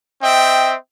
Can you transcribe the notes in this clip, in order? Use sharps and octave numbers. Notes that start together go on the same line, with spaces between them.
C4 D#5 E5 G5